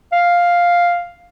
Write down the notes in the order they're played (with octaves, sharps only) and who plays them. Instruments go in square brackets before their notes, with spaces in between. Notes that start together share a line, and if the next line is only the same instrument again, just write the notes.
[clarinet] F5